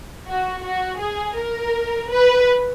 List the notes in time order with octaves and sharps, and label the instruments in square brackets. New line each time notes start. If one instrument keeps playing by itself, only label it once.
[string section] F#4
F#4
G#4
A#4
B4